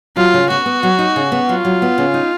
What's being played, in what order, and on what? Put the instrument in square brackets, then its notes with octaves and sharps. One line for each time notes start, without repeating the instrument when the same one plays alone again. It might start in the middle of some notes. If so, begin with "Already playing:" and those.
[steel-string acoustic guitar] F#3 [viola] F4
[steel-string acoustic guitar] C#3
[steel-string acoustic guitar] B3 [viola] F#4
[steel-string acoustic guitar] B3
F#3
D#4
C#3
B3
[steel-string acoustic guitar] F#3 [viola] F4
[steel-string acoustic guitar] F#3
B3
C#3
D#4